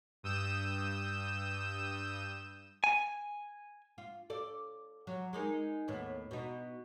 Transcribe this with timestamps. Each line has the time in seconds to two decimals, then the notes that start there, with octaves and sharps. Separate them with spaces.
0.23 G2 D#6 E6 G6 E7
2.84 G#5
3.98 F4
4.30 A4 D5
5.07 F#3
5.33 G#3 D#4 A#4
5.88 D#2 A2 B3
6.31 B2 D#4